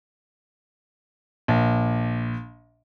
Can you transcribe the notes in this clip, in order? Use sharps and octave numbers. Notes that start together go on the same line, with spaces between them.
A#1